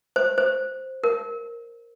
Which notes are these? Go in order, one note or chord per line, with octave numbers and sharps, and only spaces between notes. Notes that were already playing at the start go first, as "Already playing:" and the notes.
C5
C5
A#4